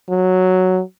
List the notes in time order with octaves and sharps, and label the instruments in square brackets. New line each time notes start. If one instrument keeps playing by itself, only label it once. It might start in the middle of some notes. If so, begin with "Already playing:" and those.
[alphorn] F#3